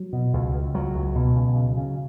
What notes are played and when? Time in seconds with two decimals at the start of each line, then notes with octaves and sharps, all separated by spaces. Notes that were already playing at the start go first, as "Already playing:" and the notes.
Already playing: F#3
0.13 B2
0.33 C#2
0.54 C#2
0.74 C#2 F#3
0.95 C#2
1.15 B2
1.36 C#3
1.56 C#3
1.77 C#3